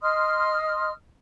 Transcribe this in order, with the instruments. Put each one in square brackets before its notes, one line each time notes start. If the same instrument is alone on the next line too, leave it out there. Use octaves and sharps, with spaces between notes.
[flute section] D#5 C6 D#6 F6